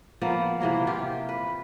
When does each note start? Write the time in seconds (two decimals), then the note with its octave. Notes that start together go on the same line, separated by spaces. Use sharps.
0.21 F3 A#3 B3 F5
0.60 C3 E3 F#3 A#3
0.87 C3 F4 G4
1.29 B4